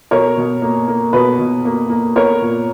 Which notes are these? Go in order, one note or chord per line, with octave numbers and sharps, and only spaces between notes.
B2 A#4 C#5
B2
A#3
A#3
B2 B4
B2
A#3
A#3
B3 A#4 C#5
A#2